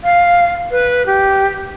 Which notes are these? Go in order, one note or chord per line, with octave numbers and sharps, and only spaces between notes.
F5
B4
G4